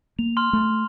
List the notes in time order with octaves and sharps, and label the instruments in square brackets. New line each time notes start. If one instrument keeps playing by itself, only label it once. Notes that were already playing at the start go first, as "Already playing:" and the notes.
[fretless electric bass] A#3 [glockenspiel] F7
[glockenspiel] C6 F6
[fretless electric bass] A3